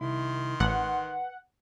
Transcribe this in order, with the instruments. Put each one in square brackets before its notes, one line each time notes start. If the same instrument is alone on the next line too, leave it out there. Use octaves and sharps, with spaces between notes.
[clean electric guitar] C2 E4 [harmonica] D#3 C6
[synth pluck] A1 [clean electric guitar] B4 [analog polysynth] F#5